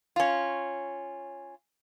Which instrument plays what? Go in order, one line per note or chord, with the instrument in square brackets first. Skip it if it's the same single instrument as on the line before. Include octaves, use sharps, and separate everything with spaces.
[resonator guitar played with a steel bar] C#4 F4